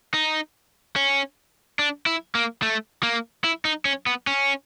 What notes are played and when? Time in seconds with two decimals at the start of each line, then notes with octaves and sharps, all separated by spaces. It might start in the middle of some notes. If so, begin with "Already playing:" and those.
0.14 D#4
0.96 C#4
1.79 D4
2.06 E4
2.35 A#3
2.63 A3
3.03 A#3
3.44 E4
3.65 D#4
3.85 C#4
4.06 B3
4.27 C#4